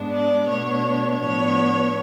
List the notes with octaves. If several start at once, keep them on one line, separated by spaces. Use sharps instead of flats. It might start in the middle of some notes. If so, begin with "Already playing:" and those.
Already playing: G#2 G#3 B3 D4
D5
B2 A3 D4 C#5
A2 F3 B3 D4 C#5